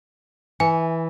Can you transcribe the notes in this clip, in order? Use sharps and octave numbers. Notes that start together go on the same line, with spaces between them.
E3 G#5